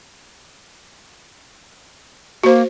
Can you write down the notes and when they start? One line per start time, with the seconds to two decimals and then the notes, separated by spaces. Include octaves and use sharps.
2.43 A#3 F#4 C5